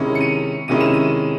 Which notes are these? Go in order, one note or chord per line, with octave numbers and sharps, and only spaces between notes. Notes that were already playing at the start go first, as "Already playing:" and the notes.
Already playing: C3 D#3 G#3 C#4 E4
C#7
D#7
C3 D#3 G#3 C#4 E4 D#7
E7
D#7